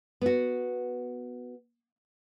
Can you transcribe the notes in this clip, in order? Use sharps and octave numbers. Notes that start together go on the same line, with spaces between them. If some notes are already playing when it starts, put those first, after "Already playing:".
B3 F#4